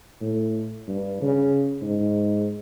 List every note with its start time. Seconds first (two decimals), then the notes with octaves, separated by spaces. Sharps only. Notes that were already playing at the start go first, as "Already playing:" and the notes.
0.21 A2
0.89 G2
1.21 C#3
1.82 G#2